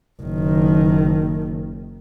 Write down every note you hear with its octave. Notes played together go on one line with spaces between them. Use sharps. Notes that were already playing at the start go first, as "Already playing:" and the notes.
F#1 D#3